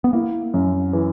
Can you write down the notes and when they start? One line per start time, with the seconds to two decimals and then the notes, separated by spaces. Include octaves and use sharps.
0.04 B3
0.13 A#3 E4
0.54 F#2
0.93 E3